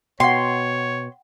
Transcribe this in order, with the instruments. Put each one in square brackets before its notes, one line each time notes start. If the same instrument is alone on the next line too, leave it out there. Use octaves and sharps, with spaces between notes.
[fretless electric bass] B2 [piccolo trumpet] C#5 [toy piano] F#5 G5 [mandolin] C6